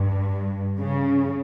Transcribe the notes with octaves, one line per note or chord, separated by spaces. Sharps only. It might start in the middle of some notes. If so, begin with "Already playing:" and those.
Already playing: G2
C#3